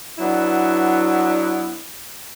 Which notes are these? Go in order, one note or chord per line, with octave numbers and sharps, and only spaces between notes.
F#3 B3 D4 E4